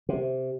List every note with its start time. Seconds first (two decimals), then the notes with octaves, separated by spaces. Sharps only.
0.09 C3